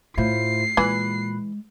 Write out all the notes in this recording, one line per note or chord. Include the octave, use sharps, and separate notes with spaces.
A2 E4 F4 C5 C7
A#2 E3 G#3 B5 F#6